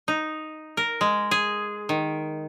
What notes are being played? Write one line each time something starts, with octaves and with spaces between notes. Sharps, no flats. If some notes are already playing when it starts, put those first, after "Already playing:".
D#4
A#4
G#3
G#4
D#3